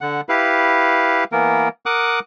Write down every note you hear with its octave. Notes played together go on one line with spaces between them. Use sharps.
D3 F#5
E4 G4 B4 F5
E3 A#3 B3 A#4
A#4 F#5 D6 D#6 F#6